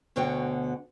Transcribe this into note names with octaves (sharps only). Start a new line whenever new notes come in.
D2 B2 D3 C#5 G5